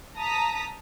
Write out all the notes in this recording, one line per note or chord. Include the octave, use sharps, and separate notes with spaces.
A5 A#5 D#6 B6